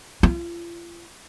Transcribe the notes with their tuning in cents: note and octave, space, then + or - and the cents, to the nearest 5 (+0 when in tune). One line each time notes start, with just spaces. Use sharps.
F4 -40